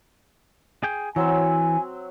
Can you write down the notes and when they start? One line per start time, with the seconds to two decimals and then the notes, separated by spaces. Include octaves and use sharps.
0.83 G#4 G5
1.16 E3 F#3 C4 G#5 E6